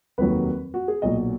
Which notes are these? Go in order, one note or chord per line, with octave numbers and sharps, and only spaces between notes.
F1 D#2 D#3 F#3 B4
F#4
G#4
B1 A#2 F#3 D#5